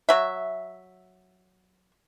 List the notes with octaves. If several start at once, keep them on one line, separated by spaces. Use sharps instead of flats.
F#3 E5